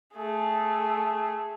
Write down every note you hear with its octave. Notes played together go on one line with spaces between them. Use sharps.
A3 G#4